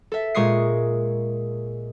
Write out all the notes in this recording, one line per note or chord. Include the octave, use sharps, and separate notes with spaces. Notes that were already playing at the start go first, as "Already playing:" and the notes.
A4 E5
A#2 G#3 C#6 D#6 C7